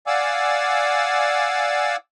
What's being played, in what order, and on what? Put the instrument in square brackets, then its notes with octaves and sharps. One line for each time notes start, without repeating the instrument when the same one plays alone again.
[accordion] D5 F5 F#5 G#5 D6 E6